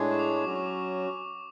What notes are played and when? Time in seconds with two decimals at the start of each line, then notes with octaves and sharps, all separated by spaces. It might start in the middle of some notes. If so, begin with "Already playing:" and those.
Already playing: A2 G#3 D4 G#4 C#5
0.12 C#6
0.19 D6
0.37 C#6
0.44 F#3 C#4 F#4 D6
0.56 C#6
0.66 D6